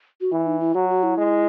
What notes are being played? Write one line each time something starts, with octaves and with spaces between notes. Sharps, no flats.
F#4
E3 E4
D#4
E4
F#3 F#4
F#4
E4
G#3